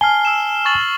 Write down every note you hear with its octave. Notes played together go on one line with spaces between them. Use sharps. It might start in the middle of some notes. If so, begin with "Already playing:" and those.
G#5 A5 F6 C7 G7
E6 E7
C#6 A6 F#7